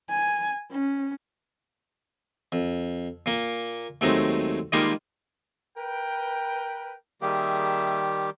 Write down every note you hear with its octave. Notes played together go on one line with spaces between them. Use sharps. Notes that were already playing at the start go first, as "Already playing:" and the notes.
G#5
C#4
F2
A#2 A#3
D#2 F#3 G#3 A3 C4 D#4
D#3 G3 G#3 A#3 D#4 F4
A#4 B4 G5
D#3 G3 A#3 G4 G#4 E5